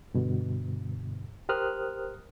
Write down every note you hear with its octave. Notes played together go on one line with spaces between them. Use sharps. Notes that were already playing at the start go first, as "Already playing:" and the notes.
G2 B2 D3
G4 A#4 C5 D#6 F6 F#6